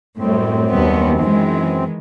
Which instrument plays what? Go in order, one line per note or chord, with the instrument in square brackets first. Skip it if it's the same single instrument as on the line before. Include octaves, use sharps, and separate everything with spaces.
[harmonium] F#2 C4 [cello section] A2 G3
[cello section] D#2 G3 B3
D#3 E3 G#3